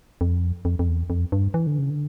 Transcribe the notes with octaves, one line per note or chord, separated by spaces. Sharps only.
F2
F2
F2
E2
F2
G2
E3
D3
C#3
D3